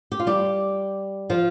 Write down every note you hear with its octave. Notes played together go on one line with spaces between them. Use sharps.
G4
F4
G3 G4
F3 F4